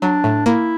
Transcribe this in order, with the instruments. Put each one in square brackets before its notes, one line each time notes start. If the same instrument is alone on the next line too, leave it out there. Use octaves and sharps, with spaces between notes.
[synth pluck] F#3 [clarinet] D4
[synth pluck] A2
[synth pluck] A#3 [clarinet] E4